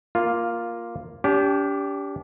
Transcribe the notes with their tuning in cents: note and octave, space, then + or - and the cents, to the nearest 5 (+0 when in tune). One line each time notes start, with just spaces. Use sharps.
A#3 +5 F4 +0
D4 -45 G4 +0